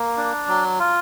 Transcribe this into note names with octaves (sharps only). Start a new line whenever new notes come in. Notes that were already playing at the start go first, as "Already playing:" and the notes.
Already playing: A#3
D4
F#3
F4